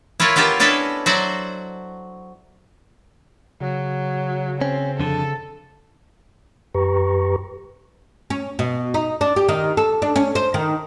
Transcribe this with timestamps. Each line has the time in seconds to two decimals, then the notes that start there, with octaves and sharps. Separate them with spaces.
0.20 E4 F4 A4 A#4 C#5
0.36 B3 F4 G4 A4 A#4 E5
0.60 C#4 D4 E4 A4 B4 D#5
1.06 F#3 F#4 C5 D5 E5
3.61 C#3 F#3
4.61 C4 C#4
4.99 F2 D3 A4
6.74 F#2 G4 B4 A#5 C#6
8.30 C#4
8.59 B2
8.94 D#4
9.21 D4
9.36 G4
9.49 D#3
9.77 A4
10.02 D4
10.16 C#4
10.35 C5
10.54 D#3